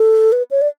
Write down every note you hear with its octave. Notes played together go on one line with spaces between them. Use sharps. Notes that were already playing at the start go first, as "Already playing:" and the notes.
Already playing: A4
B4
C#5
D5